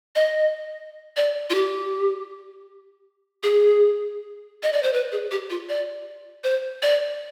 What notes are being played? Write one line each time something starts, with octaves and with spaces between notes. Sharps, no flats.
D#5
D5
F4
G4
G#4
D#5
D5
C5
B4
G#4
G4
F4
D5
C5
D5